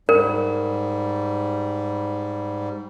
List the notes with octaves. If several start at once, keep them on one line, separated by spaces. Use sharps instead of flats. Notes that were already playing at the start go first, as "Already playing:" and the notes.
G#2 G3 A#4